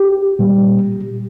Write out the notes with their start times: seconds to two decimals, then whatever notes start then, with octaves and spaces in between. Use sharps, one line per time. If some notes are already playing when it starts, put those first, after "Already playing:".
Already playing: G4
0.39 A#2 G3